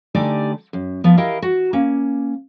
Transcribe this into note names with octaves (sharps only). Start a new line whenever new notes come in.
D3 A3 D#4 G4 D5 G#5
F#2
F3 B3
E4 G4 A#4 D#5 F5
F#4
A#3 C#4